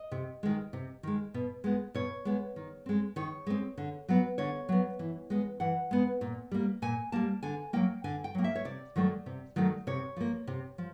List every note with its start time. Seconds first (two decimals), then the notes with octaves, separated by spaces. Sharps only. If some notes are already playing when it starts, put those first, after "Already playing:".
Already playing: D#5
0.12 C3
0.43 D#3 G#3
0.73 C3
1.03 D#3 G#3
1.34 B2
1.64 G#3 B3
1.94 B2 C#5
2.25 G#3 B3
2.56 D#3
2.86 G#3 C4
3.16 D#3 C#5
3.47 G#3 C4
3.78 D3
4.09 F#3 B3
4.38 D3 C#5
4.69 F#3 B3
4.99 E3
5.30 G#3 B3
5.60 E3 F#5
5.91 G#3 B3
6.21 A#2
6.52 G3 A#3
6.82 A#2 G#5
7.12 G3 A#3 A5
7.43 D3 G#5
7.73 F#3 A#3 G5
8.04 D3 G#5
8.24 G5
8.35 F#3 A#3
8.44 E5
8.55 C#5
8.65 C3 D5
8.96 D#3 F#3 A3
9.26 C3
9.56 D#3 F#3 A3
9.87 C3 C#5
10.17 F3 A#3
10.47 C3
10.78 F3